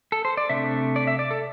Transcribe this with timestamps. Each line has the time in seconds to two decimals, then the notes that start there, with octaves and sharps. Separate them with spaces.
0.12 A4
0.25 C5
0.37 D5
0.49 C3 A3 D4 E5
0.96 D5
1.07 E5
1.19 D5
1.31 A4